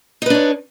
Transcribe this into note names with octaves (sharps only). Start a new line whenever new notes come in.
D4 D#4 B4 C#5